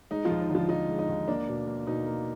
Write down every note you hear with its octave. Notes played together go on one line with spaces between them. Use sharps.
G#3 D#4
F3 F4
D#2
D#4
D3 F3 F4
F3 D#4
G#3
D#4
D#2
A#3 D4
B2
A#3
B2 D#4
A#3